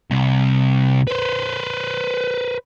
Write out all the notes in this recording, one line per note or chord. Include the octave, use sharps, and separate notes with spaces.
C2 C3
B4 C5